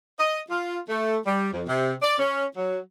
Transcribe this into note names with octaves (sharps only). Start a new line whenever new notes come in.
D#5
F4
A3
G3
F2
C3
D5
C#4
F#3